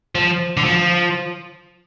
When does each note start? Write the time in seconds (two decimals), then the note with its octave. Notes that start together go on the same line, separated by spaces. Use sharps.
0.15 F3
0.57 D3
0.64 F3